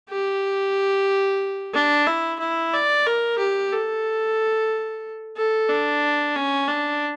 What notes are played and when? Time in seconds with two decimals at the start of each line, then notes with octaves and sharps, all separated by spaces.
0.09 G4
1.73 D4
2.07 E4
2.39 E4
2.73 D5
3.06 A#4
3.38 G4
3.72 A4
5.37 A4
5.69 D4
6.36 C#4
6.68 D4